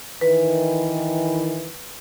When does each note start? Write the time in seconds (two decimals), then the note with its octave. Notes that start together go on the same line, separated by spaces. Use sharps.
0.21 D#3 E3 B4